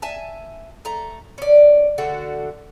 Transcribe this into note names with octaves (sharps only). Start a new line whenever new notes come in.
E5 G#5 A5
A3 A#5
C#4 D5
D3 A3 F#4